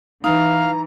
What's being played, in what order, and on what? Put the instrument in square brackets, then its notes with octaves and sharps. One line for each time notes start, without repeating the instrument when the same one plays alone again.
[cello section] E3 [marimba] D#4 [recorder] F5 [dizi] A#5